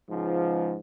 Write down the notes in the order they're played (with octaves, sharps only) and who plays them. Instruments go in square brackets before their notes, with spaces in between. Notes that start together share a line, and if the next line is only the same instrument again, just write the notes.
[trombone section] C#2 G#2 F3